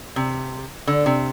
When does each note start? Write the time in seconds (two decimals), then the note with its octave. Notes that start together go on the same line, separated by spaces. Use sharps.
0.16 C3
0.87 D3
1.06 C3